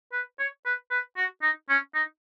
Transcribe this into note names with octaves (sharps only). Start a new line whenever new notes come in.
B4
C#5
B4
B4
F#4
D#4
C#4
D#4